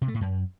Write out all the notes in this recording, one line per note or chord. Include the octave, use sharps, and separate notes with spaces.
C3
A3
A2
F#2